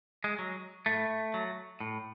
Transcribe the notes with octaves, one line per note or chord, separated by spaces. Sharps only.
G#3
F#3
A2 A3
F#3
A2